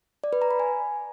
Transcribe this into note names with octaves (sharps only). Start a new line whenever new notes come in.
D5
B4
A#5
B5
G#5